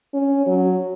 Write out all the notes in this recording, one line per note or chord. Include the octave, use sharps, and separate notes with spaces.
C#4
F#3